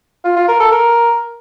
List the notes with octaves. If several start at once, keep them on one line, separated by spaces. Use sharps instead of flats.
F4
F4
A#4
A4
A#4